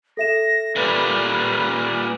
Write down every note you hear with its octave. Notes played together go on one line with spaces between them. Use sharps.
A4 E5 A#6 E7
A#2 G3 B4